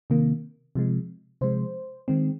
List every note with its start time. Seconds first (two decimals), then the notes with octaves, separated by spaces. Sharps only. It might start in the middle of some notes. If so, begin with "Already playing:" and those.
0.10 C3 D#3 A#3
0.75 C3 F3 G#3
1.41 C3 F3 G#3 C5
2.08 D#3 G#3 C4